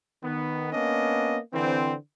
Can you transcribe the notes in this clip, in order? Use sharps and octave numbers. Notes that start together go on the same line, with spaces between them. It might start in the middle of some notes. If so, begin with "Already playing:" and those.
D#3 B3
A#3 B3 C#4 D4 D#5
D3 E3 C4